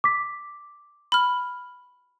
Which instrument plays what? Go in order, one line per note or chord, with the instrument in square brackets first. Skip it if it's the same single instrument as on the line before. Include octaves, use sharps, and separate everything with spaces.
[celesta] D6 B6
[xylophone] B5 F6